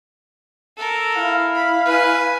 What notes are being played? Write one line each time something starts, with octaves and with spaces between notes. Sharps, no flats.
A4 A#4
E4 F5
B5
B4 G#5